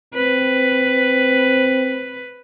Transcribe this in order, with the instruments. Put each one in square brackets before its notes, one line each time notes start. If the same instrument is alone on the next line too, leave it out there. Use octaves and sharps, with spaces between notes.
[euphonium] C4 [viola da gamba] B4